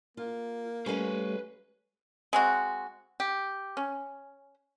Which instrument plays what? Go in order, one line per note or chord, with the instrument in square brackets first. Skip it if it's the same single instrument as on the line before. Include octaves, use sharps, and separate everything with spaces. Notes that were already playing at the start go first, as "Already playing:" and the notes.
[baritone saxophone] A#3 [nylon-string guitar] F4
[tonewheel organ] G3 A3 [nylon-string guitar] C#4 F5 [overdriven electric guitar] B4 C5
[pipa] G#3 C4 F#4
G4
C#4